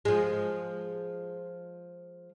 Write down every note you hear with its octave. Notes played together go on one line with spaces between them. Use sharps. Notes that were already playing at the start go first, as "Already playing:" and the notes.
F3 G#3